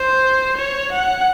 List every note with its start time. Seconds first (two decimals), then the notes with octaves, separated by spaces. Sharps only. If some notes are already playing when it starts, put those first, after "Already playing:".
Already playing: C5
0.57 C#5
0.92 F#5